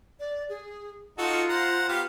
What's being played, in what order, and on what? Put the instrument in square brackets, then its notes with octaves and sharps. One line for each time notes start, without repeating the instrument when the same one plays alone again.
[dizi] D5
G#4
[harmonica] D#4 F#4 A4 [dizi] F4
[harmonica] C5 F#5 A#5
B3 G4 F5